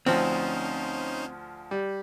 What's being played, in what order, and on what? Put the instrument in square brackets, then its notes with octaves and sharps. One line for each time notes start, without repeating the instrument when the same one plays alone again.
[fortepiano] D2 F3 [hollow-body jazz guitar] C4 [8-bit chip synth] C#4 D#4 C5
[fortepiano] G3